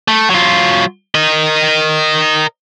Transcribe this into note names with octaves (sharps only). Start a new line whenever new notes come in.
A3
F#3 F4
A#4 D#5